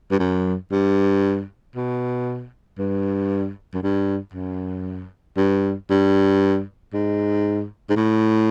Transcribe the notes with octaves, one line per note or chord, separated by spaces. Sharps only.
G2
F#2
G2
B2
G2
F#2
G2
F#2
G2
G2
G#2
G#2
A2